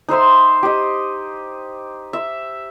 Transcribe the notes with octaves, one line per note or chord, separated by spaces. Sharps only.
D#4 C5 E5 C6
G4 D#5
E5